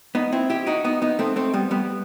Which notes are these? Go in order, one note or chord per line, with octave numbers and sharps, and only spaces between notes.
B3 D#4
C4 E4
E4 G4
D#4 F#4
B3 D#4
B3 D#4
A3 C4
A3 C4
G3 B3
G3 B3